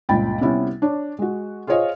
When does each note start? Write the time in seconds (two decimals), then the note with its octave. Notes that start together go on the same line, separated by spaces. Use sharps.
0.09 G1 C#2 A#2 G5 B5 A6
0.41 C3 G3 B3 C#4 E4
0.82 D4 C#5
1.19 G#3 F#4
1.67 F4 G#4 C5 C#5 D#5 F5